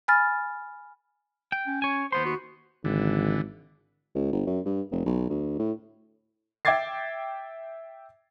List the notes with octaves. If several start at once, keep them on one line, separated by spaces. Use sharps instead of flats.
G#5 B5 F6 A6
G5
C#4
C#5 G#5
D#2 B3 C5 C6
F#4
G#1 D3 E3
C#2
G1
F#2
G2
F1
B1
D2
A2
E5 G5 D6 G#6 A6 C7